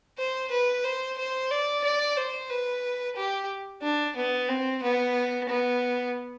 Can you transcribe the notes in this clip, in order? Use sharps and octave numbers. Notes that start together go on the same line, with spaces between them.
C5
B4
C5
C5
D5
D5
C5
B4
G4
D4
B3
C4
B3
B3